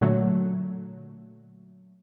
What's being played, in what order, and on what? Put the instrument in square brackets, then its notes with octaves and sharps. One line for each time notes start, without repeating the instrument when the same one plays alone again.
[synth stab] A#2 D3 F#3 A3